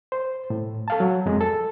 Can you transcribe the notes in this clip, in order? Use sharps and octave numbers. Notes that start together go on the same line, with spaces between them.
C5
A2
A4 F5 A5
F#3
F2 G#3
A4